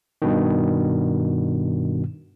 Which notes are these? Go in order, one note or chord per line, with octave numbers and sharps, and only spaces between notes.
G2 B2 D#3